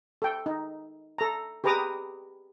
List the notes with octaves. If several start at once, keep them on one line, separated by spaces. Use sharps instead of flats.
A4 G5
D#4
A4 A#5
G4 G#4 B4 A#5 D6 D#6